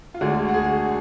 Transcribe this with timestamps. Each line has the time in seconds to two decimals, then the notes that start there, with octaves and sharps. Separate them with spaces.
0.14 F4
0.21 D2 D3 G#3 F#4
0.49 F#4
0.54 G#4